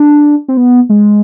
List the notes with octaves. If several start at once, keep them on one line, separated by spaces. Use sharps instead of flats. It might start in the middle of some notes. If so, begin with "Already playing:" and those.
Already playing: D4
C4
B3
G#3